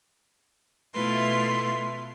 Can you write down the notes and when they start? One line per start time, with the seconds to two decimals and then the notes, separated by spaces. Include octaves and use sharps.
0.94 B2 A3 E4 F4 B4 C6